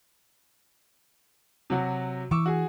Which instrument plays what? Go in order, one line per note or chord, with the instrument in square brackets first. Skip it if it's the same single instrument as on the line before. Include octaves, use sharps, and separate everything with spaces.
[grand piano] C3 F#3 F#4
[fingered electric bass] E3 [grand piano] C#6 D6 E6
[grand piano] F#4 G#4